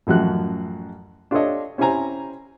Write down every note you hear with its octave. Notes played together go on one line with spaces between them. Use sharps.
A1 F#2 F3 F#4 F#6
D4 F4 G4 A4 C#5 D#5
C#4 E4 G4 C5 G#5 A#5